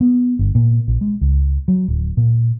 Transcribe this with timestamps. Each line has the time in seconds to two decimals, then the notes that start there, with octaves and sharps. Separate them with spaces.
0.01 B3
0.39 G1
0.55 A#2
0.88 A#1
1.01 G#3
1.21 C#2
1.68 F#3
1.88 D1
2.17 A#2